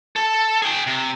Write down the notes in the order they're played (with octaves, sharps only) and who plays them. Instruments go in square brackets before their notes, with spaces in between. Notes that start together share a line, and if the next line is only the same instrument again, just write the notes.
[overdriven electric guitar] A4
G#4 G5
C3